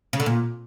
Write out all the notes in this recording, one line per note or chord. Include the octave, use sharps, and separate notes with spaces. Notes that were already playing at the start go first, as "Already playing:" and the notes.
C#3
D3
A#2